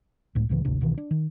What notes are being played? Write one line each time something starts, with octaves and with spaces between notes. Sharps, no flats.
C#2 A2
C#2 A2 C#3 E3
G#1 D2 C3 D4
C2 B2 D#3 E3
D4
D#3